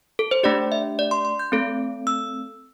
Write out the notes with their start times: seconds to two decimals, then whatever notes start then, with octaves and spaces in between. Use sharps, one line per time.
0.19 A4
0.31 C5
0.43 A3 D4 G4 D5
0.72 E5
0.99 D5
1.11 C6
1.25 C6
1.39 G6
1.52 A3 C4 A4
2.07 E6